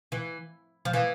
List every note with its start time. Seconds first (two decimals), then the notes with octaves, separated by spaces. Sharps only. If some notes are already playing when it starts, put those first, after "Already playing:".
0.12 E3
0.85 F3
0.93 E3